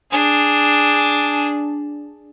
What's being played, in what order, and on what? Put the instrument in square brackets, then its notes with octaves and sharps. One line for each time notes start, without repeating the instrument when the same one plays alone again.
[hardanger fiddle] D4 G#4